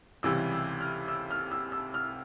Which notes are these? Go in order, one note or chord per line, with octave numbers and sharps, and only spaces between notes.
C#2 C3 E3 G3 E6
E6
F6
E6
F6
E6
E6
F6